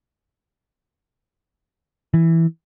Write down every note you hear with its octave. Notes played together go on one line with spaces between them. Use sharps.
E3